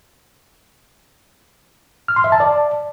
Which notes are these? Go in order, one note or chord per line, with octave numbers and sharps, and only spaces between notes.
F6
C6
E5
A5
D5